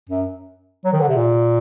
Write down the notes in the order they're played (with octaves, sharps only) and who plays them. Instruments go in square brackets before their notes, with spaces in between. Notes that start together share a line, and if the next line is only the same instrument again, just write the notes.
[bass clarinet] F#2
F#3
D#3
D3
C3
A#2